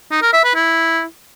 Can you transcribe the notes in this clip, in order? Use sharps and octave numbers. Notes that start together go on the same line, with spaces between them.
D#4
A#4
E5
B4
E4